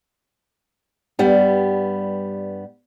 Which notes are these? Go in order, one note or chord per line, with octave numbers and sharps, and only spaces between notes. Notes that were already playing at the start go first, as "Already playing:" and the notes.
G2 G3 B3